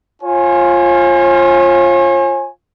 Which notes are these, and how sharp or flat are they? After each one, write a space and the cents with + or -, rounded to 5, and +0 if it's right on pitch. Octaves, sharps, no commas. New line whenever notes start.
F4 +0 C#5 -45 G#5 +0